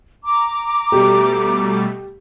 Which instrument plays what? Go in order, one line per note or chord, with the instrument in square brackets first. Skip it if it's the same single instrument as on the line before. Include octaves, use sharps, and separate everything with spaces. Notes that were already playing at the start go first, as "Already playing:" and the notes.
[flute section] A#5 D6
[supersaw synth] B2 G3 A3 [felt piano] G4